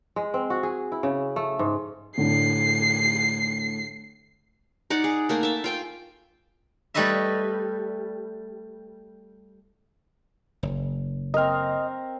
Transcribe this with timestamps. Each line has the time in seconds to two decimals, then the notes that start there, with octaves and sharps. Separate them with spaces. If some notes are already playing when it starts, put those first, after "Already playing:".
0.16 G#3
0.34 C4
0.50 F#4
0.63 G#4
0.92 E4
1.03 C#3
1.36 A3
1.59 G#2
2.18 A2 D3 C7
4.90 D#4 D5 F#5
5.04 G#4
5.29 A3 A#3
5.43 E5 A5
5.64 F4 G5 G#5
6.94 G3 A3 B4 D#5 E5
10.63 F#1
11.34 C4 A#4 D#5 F6